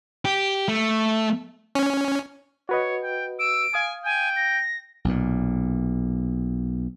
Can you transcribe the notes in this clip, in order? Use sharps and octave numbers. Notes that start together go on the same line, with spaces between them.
G4
A3
C#4
F#4 B4 C#5 D#5
G5
E6 D7
F5 G#5 D#6
G5 G#5
A#6
B1 A#2